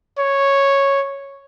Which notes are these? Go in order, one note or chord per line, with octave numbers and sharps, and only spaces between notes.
C#5